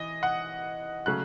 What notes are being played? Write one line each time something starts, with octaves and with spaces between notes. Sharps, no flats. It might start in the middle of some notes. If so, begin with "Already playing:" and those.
Already playing: E3 D#5
F#5
C#3 F#3 A3 F#6